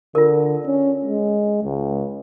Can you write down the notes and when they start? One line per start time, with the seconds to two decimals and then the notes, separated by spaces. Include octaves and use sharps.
0.15 D3 F4 A#4
0.66 C#4
1.05 G#3
1.64 C#2